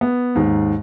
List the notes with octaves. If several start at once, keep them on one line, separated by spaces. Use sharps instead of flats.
B3
D#2 G#2